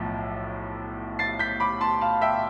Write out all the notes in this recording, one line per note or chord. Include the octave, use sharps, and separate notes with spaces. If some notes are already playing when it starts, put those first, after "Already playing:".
Already playing: B1 A2 F3
A6 C7
G6 B6
B5 D6
A5 C6
F5 A5
E5 G5